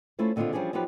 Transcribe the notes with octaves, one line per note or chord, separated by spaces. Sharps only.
A3 C#4 E4 F4 C5
A#2 D3 D#3 B3 C4 F4
E3 F3 G3 C#4 D4 G#4
F3 F#3 B3 D#4 G4 B4